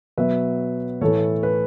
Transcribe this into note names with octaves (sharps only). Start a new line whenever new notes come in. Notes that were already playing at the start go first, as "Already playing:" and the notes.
B2 F#3 B3 B4 E5
A2 E3 A3 A4 C#5
B4